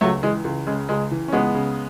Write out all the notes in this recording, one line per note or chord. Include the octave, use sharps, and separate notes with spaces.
C#2 F#3 A3
E3 G#3
C#2
C#3 G#3
C#2 G#3
E3
C#4
C#2 G#3 B3
C#3